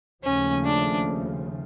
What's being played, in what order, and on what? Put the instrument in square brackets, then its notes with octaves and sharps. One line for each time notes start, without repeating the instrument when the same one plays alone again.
[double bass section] D#2 C#3 F3 A3 [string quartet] C#4
[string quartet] D4